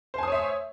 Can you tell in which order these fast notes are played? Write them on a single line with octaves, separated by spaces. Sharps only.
C5 G#5 D#6 C#5 E5